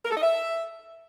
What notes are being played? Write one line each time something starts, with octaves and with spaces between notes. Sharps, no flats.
A#4
A4
D#5
E5